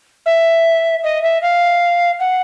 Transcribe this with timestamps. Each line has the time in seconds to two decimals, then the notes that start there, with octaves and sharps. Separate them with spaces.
0.26 E5
1.04 D#5
1.23 E5
1.42 F5
2.19 F#5